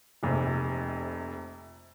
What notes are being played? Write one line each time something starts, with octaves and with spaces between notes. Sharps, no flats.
F1 A#1 F2 C3